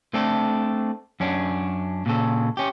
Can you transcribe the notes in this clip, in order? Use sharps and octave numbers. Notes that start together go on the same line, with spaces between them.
A3 C4 D4 A4
F#2 C#4 D4
A#2 C#3 A4
C#4 G4